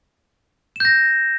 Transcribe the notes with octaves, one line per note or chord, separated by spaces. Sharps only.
G6 A#6 E7